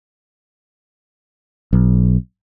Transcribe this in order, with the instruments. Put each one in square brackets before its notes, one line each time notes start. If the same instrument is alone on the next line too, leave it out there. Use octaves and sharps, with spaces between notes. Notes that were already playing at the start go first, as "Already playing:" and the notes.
[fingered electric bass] B1